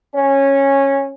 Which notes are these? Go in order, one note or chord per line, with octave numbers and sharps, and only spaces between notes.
C#4